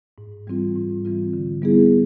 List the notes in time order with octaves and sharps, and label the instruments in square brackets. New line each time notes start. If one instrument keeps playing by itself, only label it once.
[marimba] G#2
E3 G3 C4 F4
G#2
E3 G3 C4 F4
D3
G3 B3 E4 G#4